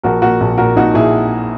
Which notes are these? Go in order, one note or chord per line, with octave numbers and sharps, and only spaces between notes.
A#1 F#4 A#4
A#2 F#4 A#4
A#1
A#2 F#4 A#4
A#2 D#4 F#4
A#2 E4 G#4